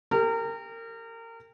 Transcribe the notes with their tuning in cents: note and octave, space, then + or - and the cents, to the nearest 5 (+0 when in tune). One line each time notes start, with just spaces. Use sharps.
G4 +30 A#4 -30